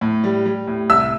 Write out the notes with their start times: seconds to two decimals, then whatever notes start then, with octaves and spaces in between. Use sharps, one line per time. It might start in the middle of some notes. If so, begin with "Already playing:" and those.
0.01 A2
0.24 G3
0.45 G3
0.67 A2
0.90 C2 E5 E6